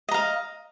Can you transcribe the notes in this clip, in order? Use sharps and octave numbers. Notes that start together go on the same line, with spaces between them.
D#5 F5 A#5